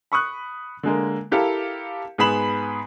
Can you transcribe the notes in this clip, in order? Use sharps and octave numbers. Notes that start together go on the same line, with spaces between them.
B5 C#6 D#6 F#6
D3 G#3 A#3
E4 G4 A4 A#4 F5
G#2 B3 G#4 B5 E7 F#7